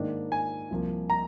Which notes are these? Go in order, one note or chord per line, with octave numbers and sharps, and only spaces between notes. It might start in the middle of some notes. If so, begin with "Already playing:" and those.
Already playing: G#2 D#3 A#3 D4
G#5
C2 C3 F3 A#3
A#5